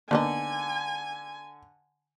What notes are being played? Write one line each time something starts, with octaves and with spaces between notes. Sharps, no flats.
D3 A#3 B3 D#4 G#5